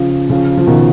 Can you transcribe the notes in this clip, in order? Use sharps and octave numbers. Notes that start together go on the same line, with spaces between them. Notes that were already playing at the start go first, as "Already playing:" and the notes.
Already playing: C#3 F3
C#3 F3
F3
B2 D#3